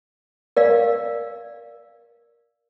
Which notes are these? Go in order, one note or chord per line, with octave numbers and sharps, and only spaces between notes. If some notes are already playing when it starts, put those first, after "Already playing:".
A#4 D5 F5